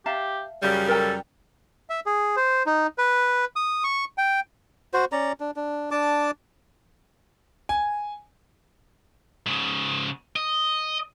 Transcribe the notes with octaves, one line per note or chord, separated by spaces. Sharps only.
G4 E5 F5 A5
F#2 C#3 G3 G5
A4 A#4 G5
E5
G#4
C5
D#4
B4
D#6
C#6
G5
F#4 C5
C#4 D5 A#5
D4
D4
D4 A5 D6
G#5
G#2 C#3
D#5